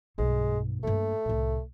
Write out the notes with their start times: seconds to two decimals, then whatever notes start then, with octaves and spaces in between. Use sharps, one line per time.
0.18 B1 G2 G#3
0.83 G2 A3 A#3
1.25 C2 A2